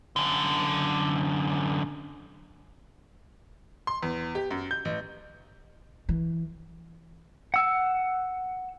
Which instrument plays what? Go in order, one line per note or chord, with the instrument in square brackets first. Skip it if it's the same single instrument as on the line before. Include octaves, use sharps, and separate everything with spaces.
[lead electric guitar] F#2 D3
[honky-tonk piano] C6
E2
G4
F#2
G6
A1
[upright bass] E3
[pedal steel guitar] F#5 E6